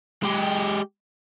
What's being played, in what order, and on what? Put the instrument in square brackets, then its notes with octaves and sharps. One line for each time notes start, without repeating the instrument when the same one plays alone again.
[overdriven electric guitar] G#3 G4